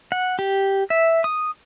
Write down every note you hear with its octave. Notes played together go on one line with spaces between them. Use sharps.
F#5
G4
E5
D#6